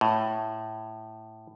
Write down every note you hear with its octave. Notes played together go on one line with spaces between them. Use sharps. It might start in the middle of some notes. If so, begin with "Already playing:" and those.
A2